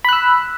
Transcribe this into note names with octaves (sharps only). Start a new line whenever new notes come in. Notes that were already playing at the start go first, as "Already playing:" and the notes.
B5 E6 F#6